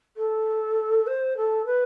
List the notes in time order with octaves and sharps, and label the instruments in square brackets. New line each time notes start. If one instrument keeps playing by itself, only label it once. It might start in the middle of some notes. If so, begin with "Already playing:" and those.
[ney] A4
C5
A4
B4